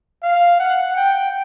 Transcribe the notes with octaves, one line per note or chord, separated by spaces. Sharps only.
F5
F#5
G5